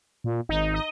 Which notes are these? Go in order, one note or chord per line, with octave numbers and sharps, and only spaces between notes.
A#2
G#1 D#4
D#5